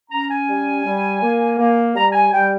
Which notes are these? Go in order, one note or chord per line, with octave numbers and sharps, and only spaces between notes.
C#4 A#5
G#5
G3
G3
A#3
A#3
G3 A#5
A#5
G#5
G3 G5